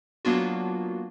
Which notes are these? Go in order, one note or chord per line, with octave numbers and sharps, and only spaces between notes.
F#3 A#3 B3 D4 F4 F#4